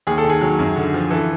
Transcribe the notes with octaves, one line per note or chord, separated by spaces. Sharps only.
D#2 G#4
A4
D#3
G#4
F#3
F#2
D3
F3
E3 A4